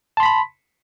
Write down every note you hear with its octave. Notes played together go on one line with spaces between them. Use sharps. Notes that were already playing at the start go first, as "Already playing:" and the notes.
A5 B5 C6 B6